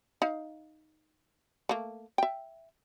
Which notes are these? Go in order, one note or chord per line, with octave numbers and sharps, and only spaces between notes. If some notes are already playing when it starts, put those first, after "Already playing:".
D#4 F5
A3 A#3
E5 G5